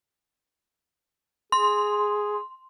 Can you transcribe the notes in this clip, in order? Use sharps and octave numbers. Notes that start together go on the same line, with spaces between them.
G#4 C6